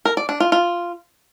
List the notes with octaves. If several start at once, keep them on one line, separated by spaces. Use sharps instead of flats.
A#4
D5
D4
F4
F4